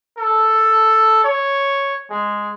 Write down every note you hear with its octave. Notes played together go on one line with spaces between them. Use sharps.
A4
C#5
G#3